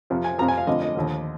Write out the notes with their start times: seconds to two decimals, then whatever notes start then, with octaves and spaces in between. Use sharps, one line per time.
0.10 F2 C3 F3
0.24 G#5
0.38 F2 C3 F3 A#5
0.48 G#5
0.58 F5
0.67 F2 D3 F3 D#5
0.82 D#5
0.95 D#2 D3 F3